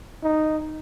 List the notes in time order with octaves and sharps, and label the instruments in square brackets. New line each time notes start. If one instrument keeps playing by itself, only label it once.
[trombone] D#4